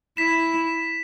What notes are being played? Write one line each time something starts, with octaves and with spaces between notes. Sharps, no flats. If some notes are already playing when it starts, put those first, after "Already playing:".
E4 B6 E7